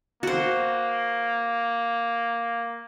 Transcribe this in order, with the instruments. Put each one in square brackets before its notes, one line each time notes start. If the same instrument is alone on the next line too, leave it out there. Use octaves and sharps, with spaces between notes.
[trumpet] A#3 [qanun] F#4 C5